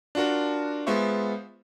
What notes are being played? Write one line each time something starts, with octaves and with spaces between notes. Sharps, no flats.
D4 F4 F#4 A#4
G#3 B3 F4 C5 E5 C#6